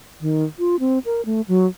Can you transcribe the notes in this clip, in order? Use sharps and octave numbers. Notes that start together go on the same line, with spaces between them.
D#3
F4
C4
A#4
A3
F#3